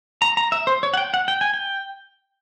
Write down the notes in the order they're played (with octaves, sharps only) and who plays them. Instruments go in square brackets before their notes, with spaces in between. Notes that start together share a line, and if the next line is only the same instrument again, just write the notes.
[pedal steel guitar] A#5
A#5
E5
C5
C#5
F#5
G5
F#5
G5
G#5
G5